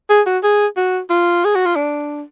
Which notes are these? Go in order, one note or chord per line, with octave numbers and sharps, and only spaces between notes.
G#4
F#4
G#4
F#4
F4
G#4
F#4
F4
D4